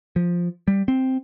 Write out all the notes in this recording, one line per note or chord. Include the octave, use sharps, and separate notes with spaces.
F3
G3
C4